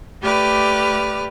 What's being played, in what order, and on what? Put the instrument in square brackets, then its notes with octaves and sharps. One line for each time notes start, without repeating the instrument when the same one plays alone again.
[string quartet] A3 G4 B4 D5 F6